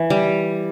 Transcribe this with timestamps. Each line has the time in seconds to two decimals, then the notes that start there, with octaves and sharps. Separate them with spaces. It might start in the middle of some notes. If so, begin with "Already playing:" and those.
Already playing: E3
0.10 G3